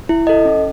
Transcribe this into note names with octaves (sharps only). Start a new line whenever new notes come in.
E4
A4 D#5
C#4